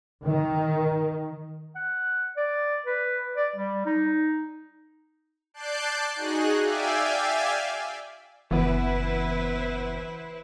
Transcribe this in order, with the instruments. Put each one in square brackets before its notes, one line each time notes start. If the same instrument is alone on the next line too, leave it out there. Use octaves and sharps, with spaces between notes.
[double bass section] D#3
[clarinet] F#5
D5
B4
D5
G3
D#4
[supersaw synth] D5 A5 F#6 G6 C7 D7
D#4 F#4 G#4 F#6
D5 E5 F5 G5 G#5
[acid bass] F#1 [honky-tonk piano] E3 B3 [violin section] E4 B4 C5